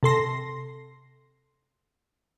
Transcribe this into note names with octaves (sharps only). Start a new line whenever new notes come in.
C3 A4 C6 A#6